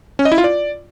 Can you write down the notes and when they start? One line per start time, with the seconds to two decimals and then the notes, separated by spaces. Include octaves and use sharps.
0.19 C#4
0.25 D#5
0.32 E4
0.38 F4
0.44 D5